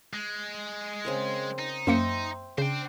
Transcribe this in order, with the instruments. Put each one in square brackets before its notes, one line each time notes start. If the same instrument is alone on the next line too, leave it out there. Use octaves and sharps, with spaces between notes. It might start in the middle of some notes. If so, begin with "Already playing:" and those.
[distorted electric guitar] G#3
[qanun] C#3 C4 A#4
[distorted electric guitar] D#4
[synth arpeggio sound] F#2 A#3 C#7 [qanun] C5 E5 G5
[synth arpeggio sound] C#3 [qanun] D4 [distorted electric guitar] C5 G5